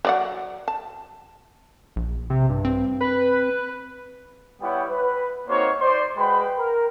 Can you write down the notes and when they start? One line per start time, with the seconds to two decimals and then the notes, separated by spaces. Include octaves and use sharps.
0.05 F#3 D5 F#5
0.68 A5
1.96 A#1
2.30 C3
2.49 G2
2.65 C4
3.00 B4
4.61 G3 B3 E4 C#5 F#5 G5
4.90 B4
5.48 A#3 C4 D#4 F#4 C5 C#5
5.81 C5 D5 C6
6.17 G#3 F#4 B4 G5 B5
6.58 A#4